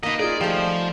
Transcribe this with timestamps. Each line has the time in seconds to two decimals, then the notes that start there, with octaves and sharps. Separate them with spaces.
0.03 A#3 D#4 B4 D#5
0.19 F4 G#4 D5
0.41 F3 G3 A3